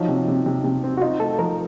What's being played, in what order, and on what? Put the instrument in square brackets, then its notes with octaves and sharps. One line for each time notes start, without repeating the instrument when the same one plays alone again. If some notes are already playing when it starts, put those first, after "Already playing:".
Already playing: [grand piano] F3 F#3 [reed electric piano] D#4
[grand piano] C3
C3
C3
C3
C4
[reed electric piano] F#4
[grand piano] D#4 [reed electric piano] F4
[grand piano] A3 [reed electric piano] A4
[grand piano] F3 [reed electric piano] A#4